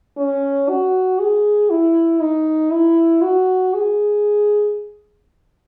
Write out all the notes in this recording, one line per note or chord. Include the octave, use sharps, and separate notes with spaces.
C#4
F#4
G#4
E4
D#4
E4
F#4
G#4